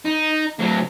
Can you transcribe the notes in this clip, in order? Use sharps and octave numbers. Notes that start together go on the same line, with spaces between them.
D#4
D2 F#3